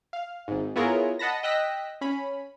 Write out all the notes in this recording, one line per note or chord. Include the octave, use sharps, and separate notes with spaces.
F5
G#1 G#2
B3 E4 F4 G#4 A#4 C#5
D#5 F#5 A5 B5 A#6
D#5 G5 E6 F#6 A#6 B6
C#4 B5